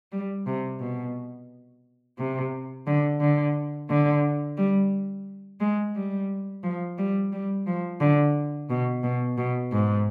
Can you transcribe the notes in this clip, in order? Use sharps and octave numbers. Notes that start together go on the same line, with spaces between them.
G3
C3
B2
C3
D3
D3
D3
G3
G#3
G3
F3
G3
G3
F3
D3
B2
B2
B2
G#2